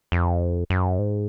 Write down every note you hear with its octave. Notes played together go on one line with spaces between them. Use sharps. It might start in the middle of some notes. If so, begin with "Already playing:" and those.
F2
F#2
G#2